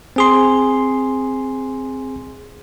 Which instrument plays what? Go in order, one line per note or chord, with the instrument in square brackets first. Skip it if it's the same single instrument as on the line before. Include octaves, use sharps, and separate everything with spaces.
[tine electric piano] C4 G#4 C6